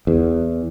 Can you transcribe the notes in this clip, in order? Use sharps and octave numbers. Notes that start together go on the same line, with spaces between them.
E2